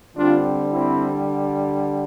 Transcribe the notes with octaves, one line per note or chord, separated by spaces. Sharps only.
D3 G3 C4 D4 F4
C4 E4